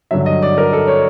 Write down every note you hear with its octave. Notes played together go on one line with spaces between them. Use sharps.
G2 D3 F#3 E5
D#5
D5
A#4
A4
C#5